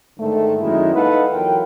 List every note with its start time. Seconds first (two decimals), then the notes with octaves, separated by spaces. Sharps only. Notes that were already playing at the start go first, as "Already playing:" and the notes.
0.18 G#2 D3 D#3 G#3 A3
0.59 F#2 D#3 G#3 A#3 E4
0.93 D#4 A4 B4 D#5 F5 F#5
1.32 E2 F#3 F4 A#4 G5